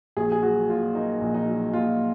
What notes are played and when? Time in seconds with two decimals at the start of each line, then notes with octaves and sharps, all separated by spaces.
0.17 A#1 G#4
0.32 G#4
0.43 F#3 F#4
0.69 A#2 F4
0.95 A#3 D#4
1.21 A#1
1.34 D#4
1.47 F#3
1.73 A#2 F4